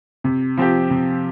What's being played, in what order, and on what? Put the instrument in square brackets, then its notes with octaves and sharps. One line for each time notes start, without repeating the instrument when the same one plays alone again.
[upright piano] C3
F3 C4 G4
C3